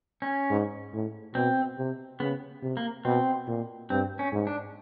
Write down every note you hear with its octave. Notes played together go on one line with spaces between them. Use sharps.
C#4
G#2
A2
B2 C4
C3
C#3 B3
C3
A#3
B2 C4
A#2
G2 C4
C#4
G#2
D4